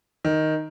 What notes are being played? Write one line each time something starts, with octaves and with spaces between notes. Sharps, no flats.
D#3